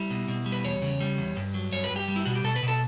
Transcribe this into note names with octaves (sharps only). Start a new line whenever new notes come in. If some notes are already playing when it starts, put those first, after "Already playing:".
Already playing: G3 E4
B2
B2
G3
B4
E2 C#5
C#3
G3
E2
G2
F#3
G2 C#5
B4
G2
G4
G3
E4
B2 F#4
G4
B2 A4
B4
B2
A4